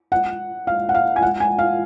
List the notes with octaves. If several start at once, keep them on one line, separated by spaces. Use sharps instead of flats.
F#5
F5
F#5
F5
G#5
F#5
G#5
F5